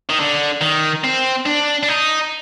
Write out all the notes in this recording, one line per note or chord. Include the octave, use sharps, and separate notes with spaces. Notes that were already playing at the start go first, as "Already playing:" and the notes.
D#3
D3
D#3
C4
D4
D4
D#4